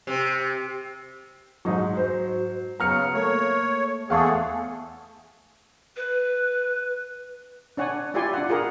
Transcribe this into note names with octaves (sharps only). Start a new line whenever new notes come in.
C3
G#2 F#3 D#4 C#6
C5
C#3 F#3 B3 A#5 F6 C#7
A3 A#3 C#5
E2 A3 G#4 A4 F5 F#5 C#6
B4
D4 C#5 F#5 G#5
E4 F4 G4 D5 G#5 C6
D4 F#5
F4 G#4 A#4 F#5